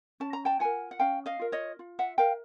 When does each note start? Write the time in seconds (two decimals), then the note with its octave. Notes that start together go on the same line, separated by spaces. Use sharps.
0.20 C#4 A5
0.33 A#5
0.45 G5 A5
0.60 F4 A#4 F#5 G#5
0.91 F#5
0.99 C#4 F5 G5
1.26 D#5 F5
1.39 F4 A#4
1.52 C#5 D#5
1.79 F4
1.99 E5 F#5
2.18 A#4 F5 G5